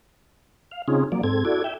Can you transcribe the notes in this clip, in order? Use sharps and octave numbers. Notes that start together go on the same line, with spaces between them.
F5
C#3 C4 C#4 D#4 F4 G#4
F3 F#3 A#3 D5
G#2 C4 A4 G#6
E4 F#4 A4 D5 G#6
E5 G5